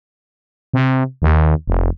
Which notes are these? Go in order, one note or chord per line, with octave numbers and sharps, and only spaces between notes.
C3
D#2
F1